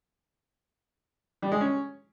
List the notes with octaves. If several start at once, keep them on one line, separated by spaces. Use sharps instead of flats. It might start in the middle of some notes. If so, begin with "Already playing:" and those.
G3
G#3
C#4